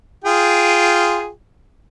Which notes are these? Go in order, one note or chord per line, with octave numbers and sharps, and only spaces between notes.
F4 G#4 G5